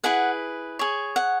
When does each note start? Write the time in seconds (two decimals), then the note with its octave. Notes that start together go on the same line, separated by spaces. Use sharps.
0.04 E4 G#4 B4 F#5
0.79 G#4 C#5
1.16 F#5